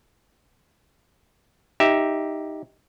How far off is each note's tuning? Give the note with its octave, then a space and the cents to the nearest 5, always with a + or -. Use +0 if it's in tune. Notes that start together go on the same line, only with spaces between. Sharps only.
D#4 +5 G4 +0 E5 +0